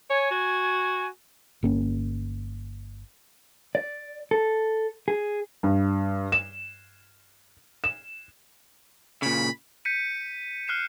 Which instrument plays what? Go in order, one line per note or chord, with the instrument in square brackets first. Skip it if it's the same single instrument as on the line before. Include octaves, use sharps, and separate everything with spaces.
[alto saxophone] C#5 [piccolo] G#5
[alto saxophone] F#4
[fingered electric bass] G1 A#3 C#4
[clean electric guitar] D5
A4
G#4
[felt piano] G2
E7
E7
[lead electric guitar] A#2 C#3 [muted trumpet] B5
[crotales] G6 B6 C#7 D#7
F6 F#6 C7 E7